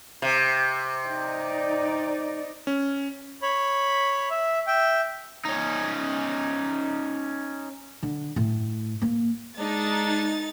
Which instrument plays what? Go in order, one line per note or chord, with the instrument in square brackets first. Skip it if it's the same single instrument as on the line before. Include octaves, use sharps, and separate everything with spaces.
[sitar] C3
[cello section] D#4 D5
[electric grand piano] C#4
[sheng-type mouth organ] C#5 B5
E5
E5 G5
[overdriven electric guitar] C#4 D#4
[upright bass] D3
A2
A#3
[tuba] G#3 [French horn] D4 [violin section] D#4 [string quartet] A6